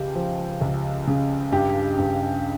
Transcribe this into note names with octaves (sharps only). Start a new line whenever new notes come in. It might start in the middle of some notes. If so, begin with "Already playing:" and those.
Already playing: C#2 G4
F3
C#2
C#3
G2 G4
G2